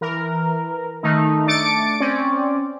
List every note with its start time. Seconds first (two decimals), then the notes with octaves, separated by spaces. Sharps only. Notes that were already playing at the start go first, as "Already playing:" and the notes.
0.01 E3 A#4
1.03 D#3 A3 D#4
1.47 A3 D4 D6 A6 C#7 D7
2.00 C4 C#4 D5